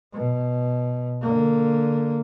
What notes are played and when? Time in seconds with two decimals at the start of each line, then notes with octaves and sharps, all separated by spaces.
0.13 B2
1.21 D3 A#3